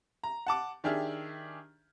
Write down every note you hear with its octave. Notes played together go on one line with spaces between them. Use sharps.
A#5
F#5 A5 D6
D#3 D4 G4 G#4 E5 F6